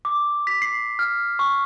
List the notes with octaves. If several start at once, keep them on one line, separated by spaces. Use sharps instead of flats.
D6
B6
C7
F6
C#6